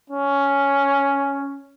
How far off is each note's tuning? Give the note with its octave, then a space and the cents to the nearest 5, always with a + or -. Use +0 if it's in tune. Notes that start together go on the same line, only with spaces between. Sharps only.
C#4 +5